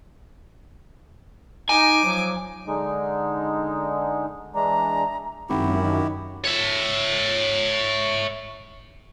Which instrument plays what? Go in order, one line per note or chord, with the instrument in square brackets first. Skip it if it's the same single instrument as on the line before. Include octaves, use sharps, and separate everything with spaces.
[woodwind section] D#4 [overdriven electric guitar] G#5 [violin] D6
[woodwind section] F3 F#3
[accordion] D3 G#3 D#4
[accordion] E3 G#3 D4 [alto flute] A#5
[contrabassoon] G#1 [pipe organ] F#2 [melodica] E4 F#4 G4
[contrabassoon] D#3
[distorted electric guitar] C#5 E5